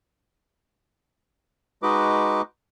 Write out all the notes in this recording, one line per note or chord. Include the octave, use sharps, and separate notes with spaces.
G#3 D#4 F#4 B4 D#5 D6